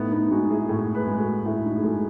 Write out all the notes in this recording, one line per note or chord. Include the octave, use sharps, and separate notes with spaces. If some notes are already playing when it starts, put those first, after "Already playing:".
Already playing: A2 B3 D#4
B3 D#4
G#3 D#4 F#4
E4 G#4
A2 F#4 A4
G#4 B4
G#3
F#4 A4
A2 E4 G#4
D#4 F#4
G#4
G#3 F#4 A4